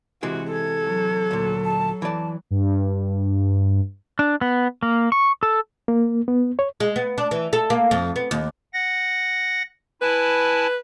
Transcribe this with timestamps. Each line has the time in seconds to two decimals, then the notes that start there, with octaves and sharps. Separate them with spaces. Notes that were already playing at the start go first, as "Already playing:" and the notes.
0.23 C3 E3 G#3 F#4
0.52 A4 G#6
0.84 F#3
1.31 D2 A#2
1.65 A5
2.02 E3 D5 A5
2.51 G2
4.19 D4
4.41 B3
4.83 A#3
5.12 C#6
5.43 A4
5.88 A#3
6.28 B3
6.59 C#5
6.80 G#3
6.96 B3
7.18 D4
7.31 E3
7.53 A4
7.70 A#3
7.91 F2
8.16 B3
8.31 D#2
8.74 F#5 A#6
10.02 E4 B4 G#5 A5